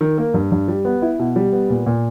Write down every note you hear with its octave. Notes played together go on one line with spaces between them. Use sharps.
D#3
A#3
G2
G2
G3
B3
E4
B2
G3
B3
A#2
A#2